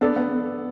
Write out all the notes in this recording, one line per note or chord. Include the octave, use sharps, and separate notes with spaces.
B3 D4 A4 D5
B3